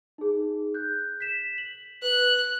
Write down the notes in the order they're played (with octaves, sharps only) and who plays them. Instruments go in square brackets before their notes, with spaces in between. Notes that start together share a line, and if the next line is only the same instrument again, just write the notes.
[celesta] D#4 G#4
F#6 G6
B6 E7
F#7
[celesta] B4 [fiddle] F#6